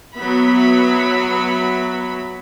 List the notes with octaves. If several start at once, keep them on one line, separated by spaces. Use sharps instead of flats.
F#3 B3 E5 B5